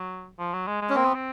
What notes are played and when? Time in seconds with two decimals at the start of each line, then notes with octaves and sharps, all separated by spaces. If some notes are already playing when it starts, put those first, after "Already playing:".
Already playing: F#3
0.39 F3
0.53 F#3
0.67 G#3
0.82 G#3
0.89 C#4
0.95 A#3 C4
1.06 B3
1.15 C4